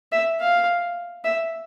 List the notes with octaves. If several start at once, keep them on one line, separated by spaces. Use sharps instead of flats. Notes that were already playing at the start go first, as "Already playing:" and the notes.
E5
F5
E5